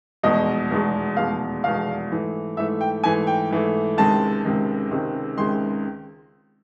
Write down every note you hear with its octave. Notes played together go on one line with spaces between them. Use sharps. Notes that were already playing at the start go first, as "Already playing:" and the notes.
F1 E2 B2 G#3 D#5
F1 E2 B2 G#3
F1 E2 B2 G#3 F5
F1 E2 B2 G#3 F5
G#2 E3 A3
G#2 E3 A3 E5
G5
G#2 E3 A3 G#5
G5
G#2 E3 A3
C#2 C3 D#3 G#3 A5
C#2 C3 D#3 G#3
C#2 C3 D#3 G#3
C#2 C3 D#3 G#3 C6